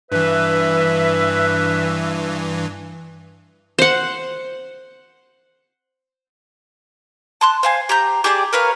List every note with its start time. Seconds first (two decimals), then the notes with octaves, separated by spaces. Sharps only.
0.12 G2 E3 B4 E5
3.79 C5 F#5
7.41 A5 C6 F#6
7.63 C5 F5 G#5
7.89 G4 A#5 G6
8.24 G4 G#4 D5 A5
8.53 A#4 B4 C#5 F5